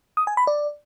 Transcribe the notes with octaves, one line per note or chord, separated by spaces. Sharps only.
D#6
G#5
B5
D5